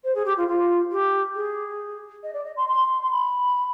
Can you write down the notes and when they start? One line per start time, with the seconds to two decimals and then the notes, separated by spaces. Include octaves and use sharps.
0.04 C5
0.15 G#4
0.25 G4
0.37 F4
0.48 F4
0.91 G4
1.35 G#4
2.23 D#5
2.34 D5
2.45 D#5
2.57 C6
2.68 C6
3.03 C6
3.11 B5